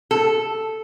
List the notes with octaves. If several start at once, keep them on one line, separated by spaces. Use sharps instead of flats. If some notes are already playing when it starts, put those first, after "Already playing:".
A4